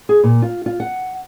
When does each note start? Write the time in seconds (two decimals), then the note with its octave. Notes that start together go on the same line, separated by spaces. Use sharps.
0.09 G#4
0.24 A#2
0.42 F4
0.66 F4
0.80 F#5